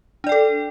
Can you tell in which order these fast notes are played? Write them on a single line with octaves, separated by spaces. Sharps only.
D4 D5 G5 A4